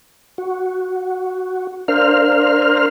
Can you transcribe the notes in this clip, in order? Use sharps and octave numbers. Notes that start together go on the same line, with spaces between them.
F#4
D4 A#4 C5 F5 F6